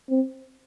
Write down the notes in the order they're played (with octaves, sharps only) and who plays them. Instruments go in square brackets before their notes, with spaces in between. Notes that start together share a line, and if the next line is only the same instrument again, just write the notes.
[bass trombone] C4